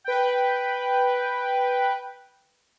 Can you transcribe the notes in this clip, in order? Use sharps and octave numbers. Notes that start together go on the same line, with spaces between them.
B4 G5